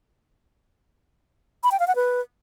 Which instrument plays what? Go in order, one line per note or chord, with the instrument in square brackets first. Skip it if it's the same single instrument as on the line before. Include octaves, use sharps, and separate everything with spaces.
[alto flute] B5
G5
F5
F#5
B4